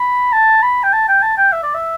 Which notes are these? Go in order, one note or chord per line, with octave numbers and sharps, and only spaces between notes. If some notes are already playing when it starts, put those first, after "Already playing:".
Already playing: B5
A5
B5
G5
A5
G5
A5
G5
E5
D5
E5